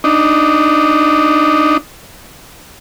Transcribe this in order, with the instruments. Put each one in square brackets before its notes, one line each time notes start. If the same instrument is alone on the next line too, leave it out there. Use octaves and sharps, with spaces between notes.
[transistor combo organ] D4 D#4